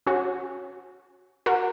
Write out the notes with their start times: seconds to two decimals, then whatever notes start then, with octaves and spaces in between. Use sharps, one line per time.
0.07 C#4 F#4
1.46 F#4 A#4